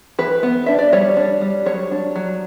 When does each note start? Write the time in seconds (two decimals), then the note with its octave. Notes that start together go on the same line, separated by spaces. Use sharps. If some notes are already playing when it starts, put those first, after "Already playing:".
0.19 E3 B4
0.43 B3
0.66 D4 E5
0.79 D5
0.92 G3 C#5
1.17 D4
1.41 G3
1.66 F#3 C#5
1.91 D4
2.16 F#3